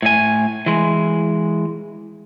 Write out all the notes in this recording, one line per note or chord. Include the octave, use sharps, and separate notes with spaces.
A2 G#5
E3 G#3